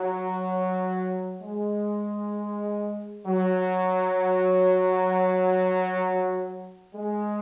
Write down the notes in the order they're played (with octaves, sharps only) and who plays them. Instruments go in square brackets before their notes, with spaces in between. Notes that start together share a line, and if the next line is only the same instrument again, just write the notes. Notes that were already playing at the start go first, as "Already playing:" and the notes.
Already playing: [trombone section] F#3
G#3
F#3
G#3